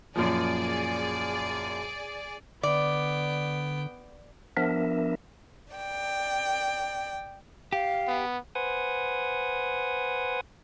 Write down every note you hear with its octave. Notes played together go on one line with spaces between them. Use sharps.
F#2 A#2 F3 G#4 D5
D3 B3 D5 G5
F3 B3 D4 A#4 E5
D5 G5
G4 F5
B3
B4 C5 F#5 G#5 D#6